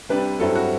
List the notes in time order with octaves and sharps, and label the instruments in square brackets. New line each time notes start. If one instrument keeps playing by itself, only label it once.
[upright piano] C3 G3 D4 B4
G2 F#3 C4 E4 A4
F#4